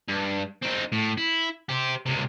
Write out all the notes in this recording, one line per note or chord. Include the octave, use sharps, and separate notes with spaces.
G2
C4 D#4
A2
E4
G4 C5
C#2 C3